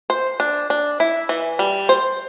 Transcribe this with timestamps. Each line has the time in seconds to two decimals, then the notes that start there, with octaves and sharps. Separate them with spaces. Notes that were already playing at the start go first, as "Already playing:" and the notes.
0.10 C5
0.40 D4
0.70 D4
1.00 E4
1.29 E3
1.59 G3
1.89 C5